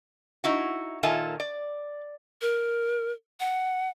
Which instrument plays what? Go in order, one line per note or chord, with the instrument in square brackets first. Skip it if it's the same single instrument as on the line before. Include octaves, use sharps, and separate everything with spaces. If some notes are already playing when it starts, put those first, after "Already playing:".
[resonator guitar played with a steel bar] D#4 E4 F#4
A#2 D#3 F4 A4 E5 G#5
D5
[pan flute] A#4
F#5